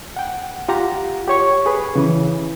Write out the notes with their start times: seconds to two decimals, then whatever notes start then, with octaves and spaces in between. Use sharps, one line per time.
0.16 F#5 G5
0.69 F4 G4 F#5 A#5
1.28 G4 C#5 C#6
1.66 G#4 B4
1.96 C#3 E3